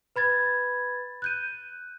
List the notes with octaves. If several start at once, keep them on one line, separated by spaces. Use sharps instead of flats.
B4 B5 G#6 A6
F#6 G6 D#7